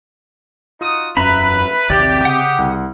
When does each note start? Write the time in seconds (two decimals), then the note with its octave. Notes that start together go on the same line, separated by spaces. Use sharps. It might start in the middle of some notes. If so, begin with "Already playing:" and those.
0.81 D#4 F4 F#4 D#6
1.17 E1 F#2 C#4 B4 E5 A#5 B5
1.90 A#1 D#2 C3 C4 G4 D5
2.25 C#3 F#5 D#6
2.59 C2